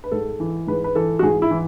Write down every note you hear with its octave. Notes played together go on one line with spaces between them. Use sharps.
B4
G#2 A4
E3
G#2 B4
B4
E3 A4
F#4
G#2 G#4
E4
E3